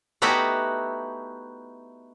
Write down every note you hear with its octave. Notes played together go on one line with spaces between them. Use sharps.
A3 B3 D#4 E4 F#4 G4